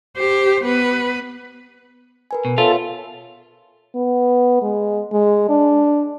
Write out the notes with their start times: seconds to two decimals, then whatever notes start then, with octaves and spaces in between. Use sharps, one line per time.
0.17 G4 C5
0.64 B3 B4
2.31 A#4 B4 G#5
2.45 B2
2.58 B3 F4 A4 C#5 E5
3.95 B3
4.63 G#3
5.13 G#3
5.49 D4